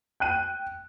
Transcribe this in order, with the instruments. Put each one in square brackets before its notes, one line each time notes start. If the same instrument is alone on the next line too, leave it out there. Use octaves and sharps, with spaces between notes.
[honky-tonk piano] G5 F#6 D#7